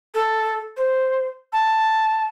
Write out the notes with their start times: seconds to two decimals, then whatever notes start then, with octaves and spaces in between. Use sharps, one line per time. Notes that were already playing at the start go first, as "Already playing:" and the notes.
0.14 A4
0.76 C5
1.52 A5